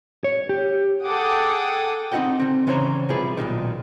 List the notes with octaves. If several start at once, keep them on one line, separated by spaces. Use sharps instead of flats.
C#5
G4
G#4 A4 F#5 G5 D6 D#6
C4 D#4 E4 F#4 F#5 G5
D3 C4
C#3 E3 C#4 C5 C#5 A#5
C3 F3 G3 E4 G#4 B4
B1 E2 A#2 D#3